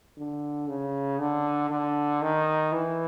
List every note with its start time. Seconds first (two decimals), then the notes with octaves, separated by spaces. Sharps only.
0.17 D3
0.68 C#3
1.19 D3
1.70 D3
2.22 D#3
2.72 E3